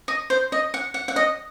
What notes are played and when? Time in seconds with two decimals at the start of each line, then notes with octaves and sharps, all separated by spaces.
0.08 D#5
0.30 C5
0.52 D#5
0.74 F#5
0.94 F#5
1.08 F#5
1.16 D#5